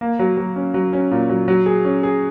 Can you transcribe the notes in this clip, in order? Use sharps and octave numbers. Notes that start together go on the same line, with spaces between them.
A#3
F#3
F#3
C#4
F#3
C#4
A#2
F#3
F#3
G#4
C#4
G#4